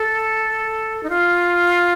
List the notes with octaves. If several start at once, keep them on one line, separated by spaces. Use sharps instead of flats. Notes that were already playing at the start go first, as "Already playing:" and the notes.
Already playing: A4
D#4
F4